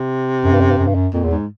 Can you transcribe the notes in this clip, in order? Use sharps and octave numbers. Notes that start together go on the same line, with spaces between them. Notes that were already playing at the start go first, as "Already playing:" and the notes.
Already playing: C3
F#2
G2
F#2
G2
F#2
G2
F#2
F2 A#2
E2
G#2